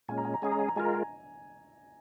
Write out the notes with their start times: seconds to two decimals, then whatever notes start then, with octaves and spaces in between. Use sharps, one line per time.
0.08 A#2 G#3 C#4 G#5
0.18 A#5
0.25 G#5
0.34 A#5
0.42 G#3 C#4 G#4 G#5
0.52 A#5
0.59 G#5
0.68 A#5
0.76 G#3 F4 A#4 G#5
0.85 A#5
0.94 G#5